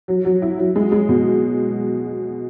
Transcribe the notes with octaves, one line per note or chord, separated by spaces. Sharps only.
F#3
F#3
E4
F#3
G#3
G#3
B2